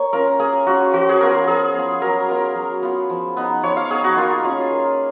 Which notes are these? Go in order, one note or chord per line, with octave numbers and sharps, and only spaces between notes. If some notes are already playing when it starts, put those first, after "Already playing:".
Already playing: A#3 C#5
C#4 F4 A#4
A#3 G#4
C#4 F4 F#4
F3 F#4
G#4
B3 F4 A#4
F3 G#4
B3 F4
F#3 A#4
B3 F4 A#4
F#3
B3 F4
F3
B3 D#4
F3 C#5
F5
B3 D#4 G#4
F#4
A#3 F4
C#4 F4
A#3